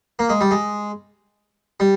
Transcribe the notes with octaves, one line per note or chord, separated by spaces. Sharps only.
A#3
G#3
G3
G#3
G3